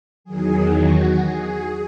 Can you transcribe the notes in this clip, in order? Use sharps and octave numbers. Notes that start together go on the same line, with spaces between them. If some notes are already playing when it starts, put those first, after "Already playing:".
E2 D#3 F#3 G#4
F#4
G#4